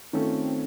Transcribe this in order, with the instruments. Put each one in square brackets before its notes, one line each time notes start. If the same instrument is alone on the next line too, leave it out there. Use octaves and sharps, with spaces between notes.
[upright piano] D#3 A3 C#4 F4 A4 [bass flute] C4